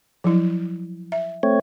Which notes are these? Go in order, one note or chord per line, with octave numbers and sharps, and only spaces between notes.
F3 F#3 E4
E5
A3 C4 C#5